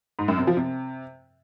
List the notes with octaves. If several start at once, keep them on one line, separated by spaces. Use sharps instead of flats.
G#2
F#2
C3
F3
C3